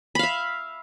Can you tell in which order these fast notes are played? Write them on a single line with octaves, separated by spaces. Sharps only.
B5 F5 E5